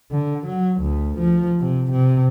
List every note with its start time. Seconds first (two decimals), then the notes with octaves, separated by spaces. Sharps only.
0.11 D3
0.47 F#3
0.81 D2
1.18 F3
1.60 C3
1.92 C3